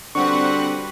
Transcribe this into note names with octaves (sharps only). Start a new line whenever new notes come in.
D3 G3 C4 F#4 B4 F#5 C#6